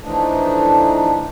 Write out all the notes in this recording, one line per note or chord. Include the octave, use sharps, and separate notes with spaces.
E3 F3 A3 D4 D#4